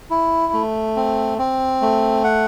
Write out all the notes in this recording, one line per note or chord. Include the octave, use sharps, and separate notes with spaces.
E4
A3
C4
C4
A3
F#5